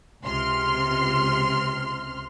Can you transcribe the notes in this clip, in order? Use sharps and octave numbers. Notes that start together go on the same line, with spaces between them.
C#2 C3 C6 F6